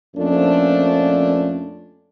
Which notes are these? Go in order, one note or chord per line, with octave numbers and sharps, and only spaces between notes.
F2 A#2 F3 A3 C#4 D4